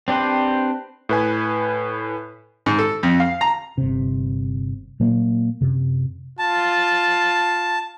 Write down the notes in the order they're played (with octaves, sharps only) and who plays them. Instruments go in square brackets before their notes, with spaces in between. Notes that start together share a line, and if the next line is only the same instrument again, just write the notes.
[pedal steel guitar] C4 D4 G4 B4 C5
[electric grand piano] A2 B4 G#5
[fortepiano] G#2
A4
F2
F5
A#5
[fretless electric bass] G1 C3
A#2 F#3 A#3
F#2 C3
[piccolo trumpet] F4 [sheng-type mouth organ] A5